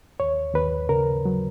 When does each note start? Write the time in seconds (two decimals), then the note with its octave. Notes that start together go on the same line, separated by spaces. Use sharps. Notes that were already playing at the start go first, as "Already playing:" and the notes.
0.20 D#2 C#5
0.54 D#2 B4
0.89 C#3 A#4
1.25 F#3